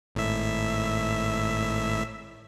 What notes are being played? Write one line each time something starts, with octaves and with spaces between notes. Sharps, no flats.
G#1 A2 E5